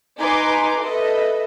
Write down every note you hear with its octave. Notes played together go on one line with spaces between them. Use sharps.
D#4 B4 G#5 A#5 C6 D6
A4 B4 D#5 E5